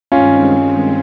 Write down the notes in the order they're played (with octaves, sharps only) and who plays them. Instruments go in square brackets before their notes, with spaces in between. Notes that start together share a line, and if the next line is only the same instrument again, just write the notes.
[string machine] G2 D#3 G#3 C4 [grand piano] C#4 F4